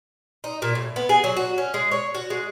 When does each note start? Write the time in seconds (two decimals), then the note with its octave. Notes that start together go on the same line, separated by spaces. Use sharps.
0.44 D#4
0.62 A#2
0.75 A2
0.96 B3
1.09 G#4
1.24 F#3
1.36 F#4
1.58 C#4
1.74 G#3
1.92 C#5
2.15 F#4
2.30 G#3